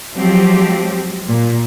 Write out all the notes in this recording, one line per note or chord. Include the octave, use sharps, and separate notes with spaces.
F3 F#3 G#3 C4 G4
A#2